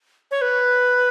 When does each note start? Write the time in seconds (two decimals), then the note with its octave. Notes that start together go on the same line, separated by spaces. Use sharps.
0.31 C#5
0.41 B4